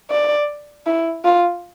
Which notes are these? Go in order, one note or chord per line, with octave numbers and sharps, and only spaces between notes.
D5
E4
F4